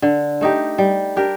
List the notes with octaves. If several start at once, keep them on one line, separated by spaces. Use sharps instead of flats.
D3
A3 D#4 G4
G3
D4 G4 A#4